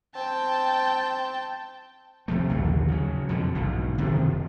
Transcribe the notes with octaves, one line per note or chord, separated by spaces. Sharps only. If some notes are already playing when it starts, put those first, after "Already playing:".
C4 G5 A5
C3 F3 A3
A#1 D#2 D3 F#3
C#3 E3 F#3
F2 B2 D3
B1 G#2 E3
F#1 C3 D#3 F3